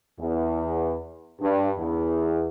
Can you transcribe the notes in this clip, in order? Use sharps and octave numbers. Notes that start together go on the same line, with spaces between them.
E2
G2
E2